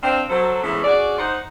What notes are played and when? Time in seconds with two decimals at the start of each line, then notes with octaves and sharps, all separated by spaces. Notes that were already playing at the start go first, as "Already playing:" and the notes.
0.03 C4 D4 F5
0.30 F#3 A4 C5
0.63 E3 G#3 A3 B3 C#4 A4
0.83 C#4 F#4 G#4 D5
1.18 D#4 C5 F#5